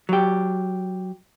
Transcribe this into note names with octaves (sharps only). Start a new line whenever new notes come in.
F#3 G4